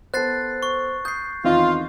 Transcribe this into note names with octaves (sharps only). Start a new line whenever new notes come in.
B3 A4 C5 F#6 A6 C7
C#6
D#6 G6 C7
E2 D#3 C4 F4 D#5